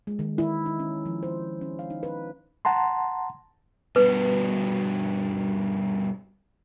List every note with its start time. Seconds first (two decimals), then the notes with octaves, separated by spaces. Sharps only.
0.07 G#3
0.19 D#3
0.38 E4
0.66 D#4
0.80 C#4
1.05 F3
1.23 C5
1.61 C#4
1.79 F5
1.90 D#4
2.03 B4
2.65 F#5 A5 A#5 C6
3.96 G2 B2 B4